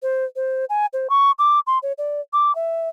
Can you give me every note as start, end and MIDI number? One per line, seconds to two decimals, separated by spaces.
0.02 0.24 72
0.36 0.65 72
0.69 0.86 80
0.93 1.07 72
1.10 1.31 85
1.39 1.59 86
1.67 1.78 84
1.82 1.92 73
1.98 2.21 74
2.33 2.54 86
2.55 2.89 76